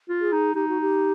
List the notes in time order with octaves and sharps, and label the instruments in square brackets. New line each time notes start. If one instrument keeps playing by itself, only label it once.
[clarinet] F4
[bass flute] G#4
[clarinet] D#4
[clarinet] D#4 [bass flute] G4
[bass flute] F#4
G4